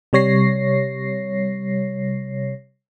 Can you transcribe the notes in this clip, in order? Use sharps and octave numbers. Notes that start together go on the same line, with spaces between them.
C3 G3 C#5 A#6 C7